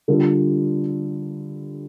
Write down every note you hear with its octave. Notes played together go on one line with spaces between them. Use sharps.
D3 G3 F4 A4